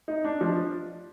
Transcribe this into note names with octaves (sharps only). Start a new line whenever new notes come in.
D#4
D4
F3